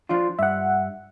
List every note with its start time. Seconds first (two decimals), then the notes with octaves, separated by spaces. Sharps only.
0.09 F3 D4 F4
0.39 G2 E5 F#5